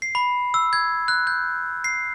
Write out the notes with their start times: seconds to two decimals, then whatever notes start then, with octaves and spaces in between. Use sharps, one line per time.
0.02 C7
0.15 B5
0.54 E6
0.73 G#6
1.08 F#6
1.27 G6
1.84 C7